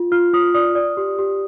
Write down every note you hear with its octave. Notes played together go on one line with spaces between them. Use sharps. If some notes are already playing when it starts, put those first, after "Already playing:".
Already playing: F4
F4 F6
F4 D#6
D5 D#6
D5
G4
G4